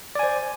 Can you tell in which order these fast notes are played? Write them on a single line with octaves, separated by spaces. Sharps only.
D5 G#5 C5